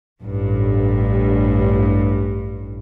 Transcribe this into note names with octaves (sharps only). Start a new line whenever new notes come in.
A1 G2